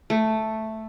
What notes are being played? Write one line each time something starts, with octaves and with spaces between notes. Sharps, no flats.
A3